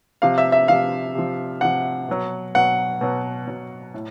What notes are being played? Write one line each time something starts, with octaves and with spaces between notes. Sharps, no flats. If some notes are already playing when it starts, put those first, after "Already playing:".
C3 F3 F5
E5
E5
C3 F3 F5
C3 F3
C3 F3 F#5
B2 F#3
B2 F#3 F#5
B2 F#3
B2 F#3
A2